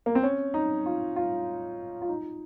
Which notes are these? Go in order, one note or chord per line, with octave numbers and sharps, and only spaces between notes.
A#3
C4
C#4
D#4
F4
F4
F4
D#4